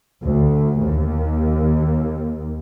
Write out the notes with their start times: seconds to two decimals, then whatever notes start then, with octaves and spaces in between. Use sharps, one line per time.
0.23 D2
0.81 D#2